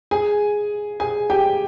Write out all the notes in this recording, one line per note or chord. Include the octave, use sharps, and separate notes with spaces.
G#4 G#5
G#4 G#5
G4 G5